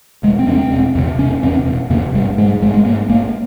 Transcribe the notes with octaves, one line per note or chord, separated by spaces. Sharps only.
E1 G#3
C4
E2 C3 C#4
C4
E1
E2 C3
E1 C#4
E2 C3 C4
E1
E2 C3 A#3
G#1 G3
G#2 G#3
G#1 G#3
G#3
G#2 A#3
G#1 A#3